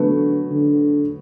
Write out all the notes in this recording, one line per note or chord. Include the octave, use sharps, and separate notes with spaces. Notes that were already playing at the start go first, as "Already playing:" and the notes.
Already playing: D3 F#3 A3 B3
D3